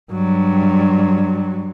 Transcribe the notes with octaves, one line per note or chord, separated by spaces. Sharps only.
G2 F#3